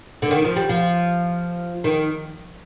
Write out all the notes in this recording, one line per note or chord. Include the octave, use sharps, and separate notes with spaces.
D3
D#3
F3
G3
F3
D#3